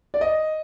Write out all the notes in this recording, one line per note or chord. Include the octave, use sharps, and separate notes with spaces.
D5
D#5